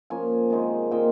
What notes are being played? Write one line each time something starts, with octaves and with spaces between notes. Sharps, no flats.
F3 A#3 C#4 G#5
C3 D#3 G#3 D#4
A#2 G#3 C4 D#4 G5